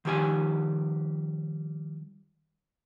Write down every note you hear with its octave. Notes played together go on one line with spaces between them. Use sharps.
D#3 F3 G3 G4 E5 G#5